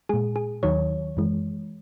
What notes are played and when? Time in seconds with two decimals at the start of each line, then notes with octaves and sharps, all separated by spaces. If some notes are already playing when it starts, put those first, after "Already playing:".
0.09 A#2 G#3 G#4
0.36 G#4
0.63 D#2 D#3 F#3 C#5
1.17 F#2 E3 G#3